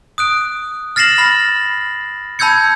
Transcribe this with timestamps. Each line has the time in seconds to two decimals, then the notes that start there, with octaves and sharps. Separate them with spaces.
0.18 D#6 F#6 D7
0.96 F6 A6 A#6 C7 E7 F#7
1.18 B5 F6
2.39 A5 B5 E6 G6 G#6 C#7